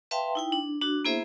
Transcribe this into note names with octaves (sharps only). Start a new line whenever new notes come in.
B4 E5 F5 G5 A5 C6
D#4 E4 G5
D4
D4 F#4
A#3 B3 E4 G#4 C5 E5